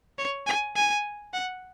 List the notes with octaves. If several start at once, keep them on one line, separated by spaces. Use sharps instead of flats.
C#5
G#5
G#5
F#5